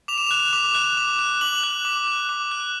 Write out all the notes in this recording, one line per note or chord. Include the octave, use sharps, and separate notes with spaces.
D6 F7
E7
F#6 F7
D6
F#6
D6
F#6
D6 F#7
F#6
D6
F#6
D6
F#6